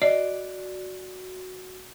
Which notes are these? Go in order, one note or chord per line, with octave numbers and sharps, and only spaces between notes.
F#4 D5 D#5